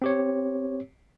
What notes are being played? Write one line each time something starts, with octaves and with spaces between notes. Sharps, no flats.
C4 G4 C#5